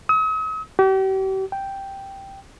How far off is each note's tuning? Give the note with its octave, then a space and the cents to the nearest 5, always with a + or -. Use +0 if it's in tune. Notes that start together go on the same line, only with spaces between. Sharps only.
D#6 +45
G4 -40
G5 +0